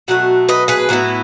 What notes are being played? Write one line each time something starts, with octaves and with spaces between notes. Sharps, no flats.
B2 F#3 A3 F#5
B4 D#5
G#4 B4
A2 F#3 B3 E4